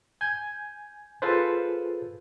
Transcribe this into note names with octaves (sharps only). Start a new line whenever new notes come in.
G#5 G6 G#6
F4 G#4 A4 B4 C5